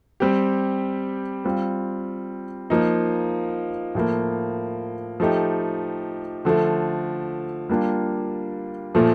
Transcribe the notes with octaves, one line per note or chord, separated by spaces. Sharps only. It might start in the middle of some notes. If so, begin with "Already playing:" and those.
G3 C4 G4
G3 C4 F4
F3 A#3 D#4
A2 F3 A#3
F3 A3 D#4 G4
D3 F3 A3
G3 A#3 D4 F4
A#2 F3 A3